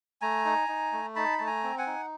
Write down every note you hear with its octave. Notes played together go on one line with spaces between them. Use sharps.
A3 G#5 A#5
D#4
D#4
A3
D#4 A5 B5
A3 A5
G#5 A#5
C4
F#5 G#5
D#4